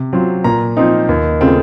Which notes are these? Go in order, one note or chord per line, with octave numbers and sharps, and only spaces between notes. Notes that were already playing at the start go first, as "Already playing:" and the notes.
Already playing: C3
F#3 C4 F4
A#2 A#5
F3 C4 D#4
D#2
C#3 A3 C4 F4